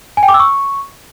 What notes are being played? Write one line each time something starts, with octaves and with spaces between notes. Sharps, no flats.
G#5
G5
D6
E6
C#6